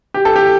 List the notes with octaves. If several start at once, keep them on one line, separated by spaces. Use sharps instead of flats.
G4
A4
G4